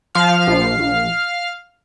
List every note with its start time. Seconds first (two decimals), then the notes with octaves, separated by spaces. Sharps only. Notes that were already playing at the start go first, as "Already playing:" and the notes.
0.15 F3 F5 F6
0.47 A#1
0.79 A#1